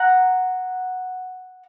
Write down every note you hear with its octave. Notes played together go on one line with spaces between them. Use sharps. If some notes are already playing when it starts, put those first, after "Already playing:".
Already playing: F#5 A#5